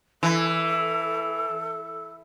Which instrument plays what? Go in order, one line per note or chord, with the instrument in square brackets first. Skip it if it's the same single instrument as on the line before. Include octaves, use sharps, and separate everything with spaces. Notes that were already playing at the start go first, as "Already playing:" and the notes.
[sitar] E3 [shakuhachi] A4